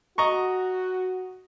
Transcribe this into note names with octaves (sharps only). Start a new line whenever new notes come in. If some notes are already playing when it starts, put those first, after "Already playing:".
F#4 D#5 A#5 C#6